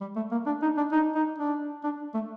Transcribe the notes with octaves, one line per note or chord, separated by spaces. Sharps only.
G3
A3
A#3
D4
D#4
D4
D#4
D#4
D4
D4
A3